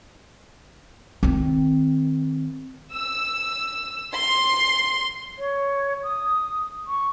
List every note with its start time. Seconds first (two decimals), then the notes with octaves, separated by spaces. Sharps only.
1.23 D#3 C4
2.92 E6
4.13 C6
5.38 C#5
6.03 D#6
6.87 C#6